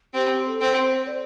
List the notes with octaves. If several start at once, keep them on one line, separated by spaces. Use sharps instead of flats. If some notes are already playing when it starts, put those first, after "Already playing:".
C4 G4
A4
C4
C5
D5